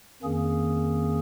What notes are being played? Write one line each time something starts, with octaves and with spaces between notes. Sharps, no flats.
F2 D#3 A#3 C#4 G#4